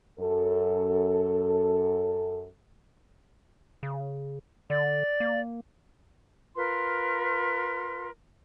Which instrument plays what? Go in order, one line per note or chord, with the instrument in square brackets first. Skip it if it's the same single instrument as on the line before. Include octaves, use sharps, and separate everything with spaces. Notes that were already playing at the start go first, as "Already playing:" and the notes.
[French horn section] F#2 A4
[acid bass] C#3
[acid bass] D3 [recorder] D5
[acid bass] A#3
[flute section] F4 A#4 B4 C6